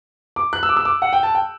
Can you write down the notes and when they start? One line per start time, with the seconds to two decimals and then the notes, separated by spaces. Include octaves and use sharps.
0.36 D6
0.53 F#6
0.63 E6
0.69 D6
0.77 E6
0.85 D6
1.02 F#5
1.13 G5
1.23 A5
1.35 G5